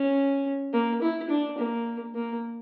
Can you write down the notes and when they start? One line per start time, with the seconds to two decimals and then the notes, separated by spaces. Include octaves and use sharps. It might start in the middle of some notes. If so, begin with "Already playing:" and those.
Already playing: C#4
0.73 A#3
1.02 E4
1.30 D4
1.58 A#3
2.15 A#3